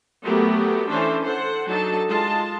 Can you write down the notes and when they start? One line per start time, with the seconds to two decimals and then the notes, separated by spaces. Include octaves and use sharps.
0.24 F#3 A3 B3 G4 A#4
0.89 E3 C#4 D4 A4 C5 E5
1.21 A4 C5 F#5
1.67 F#3 D4 D#4 A4 A5
2.07 G#3 F4 A5